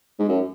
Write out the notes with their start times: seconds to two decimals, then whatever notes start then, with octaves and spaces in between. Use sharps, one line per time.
0.19 G#2
0.28 F#2